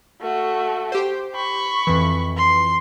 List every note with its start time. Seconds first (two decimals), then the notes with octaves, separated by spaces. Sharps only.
0.21 A3 F#4
0.92 G4 C5
1.35 B5 C#6
1.87 F2 E3
2.37 C6